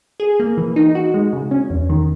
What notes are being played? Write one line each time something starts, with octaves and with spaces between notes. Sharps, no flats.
G#4
A#3
E3
D#4
F#4
G#3
C#3
C#4
E2
D#3